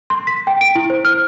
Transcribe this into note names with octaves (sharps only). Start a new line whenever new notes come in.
C6
B6
G5
D7
E4
C5
F6